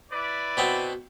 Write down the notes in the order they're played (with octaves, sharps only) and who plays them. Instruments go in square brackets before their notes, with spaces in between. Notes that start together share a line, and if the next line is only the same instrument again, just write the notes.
[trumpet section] E4 B4 D5
[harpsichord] B2 B3 C4